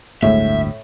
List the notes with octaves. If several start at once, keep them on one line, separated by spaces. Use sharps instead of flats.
G1 D2 A2 G#3 E5